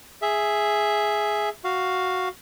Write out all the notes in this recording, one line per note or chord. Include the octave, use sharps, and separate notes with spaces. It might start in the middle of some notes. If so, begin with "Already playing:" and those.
G#4 E5
F#4 F5